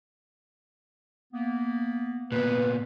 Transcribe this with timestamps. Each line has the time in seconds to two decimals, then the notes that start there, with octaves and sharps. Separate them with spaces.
1.33 A#3 B3
2.32 A#2 B3 B4